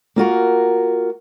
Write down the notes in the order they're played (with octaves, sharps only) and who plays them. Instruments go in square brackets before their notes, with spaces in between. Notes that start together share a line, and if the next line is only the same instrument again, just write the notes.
[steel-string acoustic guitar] A#3 F4 F#4 A#4